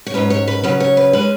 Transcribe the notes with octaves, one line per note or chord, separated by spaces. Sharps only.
C#5
G#2 F#3 C#4 B4
C#5
B4
C#3 F#3 C#4 B4
C#5
B4
G#3 C#4 B4